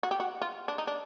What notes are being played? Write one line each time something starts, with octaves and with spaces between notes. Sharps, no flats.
F#4
G4
F#4
F4
D4
D#4
D4